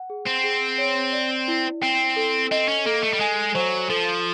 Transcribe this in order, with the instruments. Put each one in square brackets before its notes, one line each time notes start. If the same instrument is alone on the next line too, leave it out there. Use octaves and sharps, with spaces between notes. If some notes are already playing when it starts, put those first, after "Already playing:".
Already playing: [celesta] F#5
G#4
[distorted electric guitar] C4
[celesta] G#4
C#5
D5
E4
[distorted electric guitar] C4 [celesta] G5
[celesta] A4
[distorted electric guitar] C4 [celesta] D#5
[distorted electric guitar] C#4
[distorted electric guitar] A#3 [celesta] A4
[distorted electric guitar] A3
G3
[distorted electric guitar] G#3 [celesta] G#5
[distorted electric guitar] F#3 [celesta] C5
[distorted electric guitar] F3 [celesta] A4